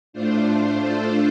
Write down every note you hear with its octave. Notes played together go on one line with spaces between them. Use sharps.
A2 A3 D4 F4 C5
A3 D4 F4 A4 C5